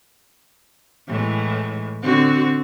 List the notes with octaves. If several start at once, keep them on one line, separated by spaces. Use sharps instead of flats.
A2 E3 G#3
D3 C4 F#4